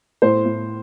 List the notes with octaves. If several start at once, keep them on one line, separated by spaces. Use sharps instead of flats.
A2 C5
A2